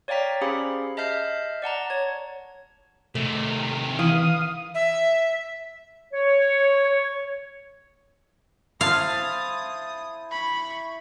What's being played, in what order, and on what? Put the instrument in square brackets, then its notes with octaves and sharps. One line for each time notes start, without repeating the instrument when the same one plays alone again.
[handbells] C#5 D5 F5 G5 A#5 B6
C#4 G4 G#4 C5 F5 B5
D#5 E5 A5 F6 G6 C7
D5 F#5 A5 A#5
C#5 G#6
[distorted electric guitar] C3 D#3 [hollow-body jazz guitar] A3
[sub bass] E3 [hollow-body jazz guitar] E4 [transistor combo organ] F5 D#6
[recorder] E5
[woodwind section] C#5
[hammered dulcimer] E4 C5 A5 [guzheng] F5 [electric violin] D#6
[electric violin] B5 C#6